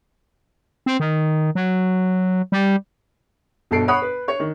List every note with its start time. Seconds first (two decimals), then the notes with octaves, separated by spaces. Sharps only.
0.86 C4
1.00 D#3
1.55 F#3
2.52 G3
3.71 G1 B2 A4 C7 D7
3.88 C#5 F#5 B5 D#6 F#6
4.02 B4
4.28 C#5 C#6
4.40 D#3